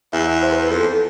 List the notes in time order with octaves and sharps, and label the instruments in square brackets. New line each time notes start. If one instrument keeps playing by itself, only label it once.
[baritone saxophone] E2 [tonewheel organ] E5
[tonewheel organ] E5
C5
B4
B4
[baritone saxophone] F2 [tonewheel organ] A4